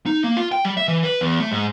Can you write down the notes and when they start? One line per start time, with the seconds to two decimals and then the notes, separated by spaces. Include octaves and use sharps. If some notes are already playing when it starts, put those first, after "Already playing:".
0.06 D#4
0.24 A#3
0.37 F4
0.52 G5
0.65 G3
0.77 E5
0.88 E3
1.04 B4
1.21 E2
1.39 A3
1.51 G#2